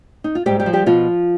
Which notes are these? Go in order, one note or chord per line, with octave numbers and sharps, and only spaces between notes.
D#4
F4
G#2 G3 G4
G3 G4
F3
G3 G4
B2 F3 F4